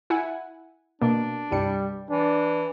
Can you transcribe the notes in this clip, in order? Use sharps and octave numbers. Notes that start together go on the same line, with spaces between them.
E4 F#5 G#5
B2 A#3 D4
C2 G2 G3 C#7
E3 D4